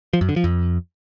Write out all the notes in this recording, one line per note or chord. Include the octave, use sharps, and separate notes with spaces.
F3
F#2
D3
F3
F2